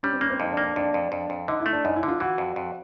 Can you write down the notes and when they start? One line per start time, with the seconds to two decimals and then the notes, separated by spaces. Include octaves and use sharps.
0.03 G3 C#4
0.13 C4
0.21 A#3 C#4
0.30 C4
0.39 F2 D#4
0.52 D4
0.57 A#3
0.64 D4
0.76 F2 D4
0.94 F2
1.12 F2
1.30 F2
1.48 D3 D#4
1.60 E4
1.66 A3
1.73 D4
1.85 F#2 D#4
1.96 E4
2.03 D3
2.08 F4
2.20 E3 F#4
2.38 F2
2.56 F2